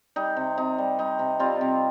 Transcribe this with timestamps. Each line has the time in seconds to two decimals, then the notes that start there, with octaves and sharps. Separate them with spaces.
0.16 G3 D#4
0.37 C3
0.58 C3 D#4
0.78 G3
0.99 G3 D#4
1.19 C3
1.39 G3 C4 F4
1.61 C3